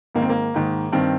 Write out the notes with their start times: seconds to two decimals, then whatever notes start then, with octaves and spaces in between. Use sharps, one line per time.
0.15 G#2 D#3 A#3
0.22 C4
0.29 A#3
0.54 G#2 D#3
0.92 G2 D#3 C4